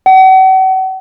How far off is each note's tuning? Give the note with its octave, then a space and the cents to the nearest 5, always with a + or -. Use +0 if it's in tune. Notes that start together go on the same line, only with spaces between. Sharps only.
F#5 +40